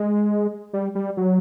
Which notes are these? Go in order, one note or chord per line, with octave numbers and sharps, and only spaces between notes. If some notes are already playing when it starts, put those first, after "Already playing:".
Already playing: G#3
G3
G3
F#3